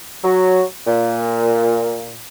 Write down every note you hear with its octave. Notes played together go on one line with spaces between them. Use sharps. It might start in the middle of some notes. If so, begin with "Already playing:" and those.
F#3
A#2